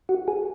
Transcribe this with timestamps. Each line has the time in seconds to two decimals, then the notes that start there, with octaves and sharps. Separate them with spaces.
0.09 F#4
0.28 G#4